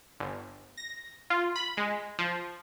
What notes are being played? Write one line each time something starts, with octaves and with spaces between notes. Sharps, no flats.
G1
A#6
F4
B5
G#3
F3